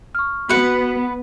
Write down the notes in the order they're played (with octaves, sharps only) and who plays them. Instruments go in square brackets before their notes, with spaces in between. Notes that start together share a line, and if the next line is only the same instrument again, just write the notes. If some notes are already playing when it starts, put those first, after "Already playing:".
[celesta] C#6 F6
[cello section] B3 [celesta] F#4 [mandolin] B4 F#5